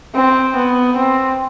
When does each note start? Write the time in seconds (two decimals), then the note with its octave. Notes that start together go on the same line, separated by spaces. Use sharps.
0.15 C4
0.56 B3
0.96 C4